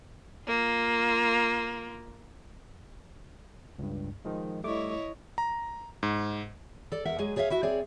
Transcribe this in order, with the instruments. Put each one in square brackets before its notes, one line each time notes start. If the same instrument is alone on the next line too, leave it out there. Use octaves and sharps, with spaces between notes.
[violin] A#3 F4
[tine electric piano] C#2 G2
D#3 F3 G#3
[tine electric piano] G3 A3 D6 [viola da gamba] E4 C#5 D#5
[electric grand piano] A#5
G#2
[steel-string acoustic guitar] A4 D5
E2 A#4 E5 F#5
F#3 G#3 G#4
G#4 C#5 D5 E5 F5
E4 F#4 E5
C4 G#4 C#5 D5